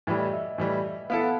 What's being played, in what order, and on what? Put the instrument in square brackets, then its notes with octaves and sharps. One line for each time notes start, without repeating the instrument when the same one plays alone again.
[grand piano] A2 E3 G3 [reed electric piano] E5
[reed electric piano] D#5
E5
[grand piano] A2 E3 G3
[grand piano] B3 E4 A4 [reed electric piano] F5
[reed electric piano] F#5